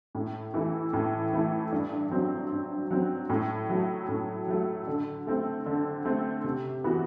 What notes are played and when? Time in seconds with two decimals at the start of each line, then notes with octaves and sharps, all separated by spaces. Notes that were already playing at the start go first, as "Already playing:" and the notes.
0.15 A2
0.54 E3 A3 E4
0.93 A2
1.33 E3 A3 E4
1.72 G2
2.11 F#3 C4
2.51 G2
2.91 F#3 C4
3.29 A2
3.69 F#3 A3
4.08 A2
4.48 F#3 A3
4.87 D3
5.27 A3 C4
5.66 D3
6.05 A3 C4
6.44 C3
6.84 E3 B3 F#4